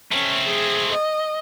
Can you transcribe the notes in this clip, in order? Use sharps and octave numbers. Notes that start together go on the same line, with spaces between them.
A3 C4 C#4
G#4
D#5